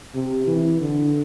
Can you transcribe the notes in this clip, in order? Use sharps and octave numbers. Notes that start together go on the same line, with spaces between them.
C3
E3
D3